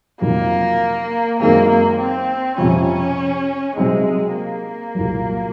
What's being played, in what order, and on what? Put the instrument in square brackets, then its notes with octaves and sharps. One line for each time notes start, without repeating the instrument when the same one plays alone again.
[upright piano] F2 C3 D#3 F#3 [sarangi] A#3
[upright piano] F#2 D#3 G#3 C4 [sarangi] A#3
[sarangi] A#3
C4
[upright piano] F2 C3 F3 [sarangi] C#4
[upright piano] C3 F#3 C4 D#4 [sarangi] G#3
[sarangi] A#3
[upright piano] C2 A#2 F#3